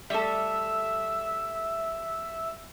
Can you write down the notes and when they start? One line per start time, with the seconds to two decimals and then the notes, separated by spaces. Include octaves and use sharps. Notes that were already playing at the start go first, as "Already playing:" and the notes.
0.10 G3 A3 A4 E5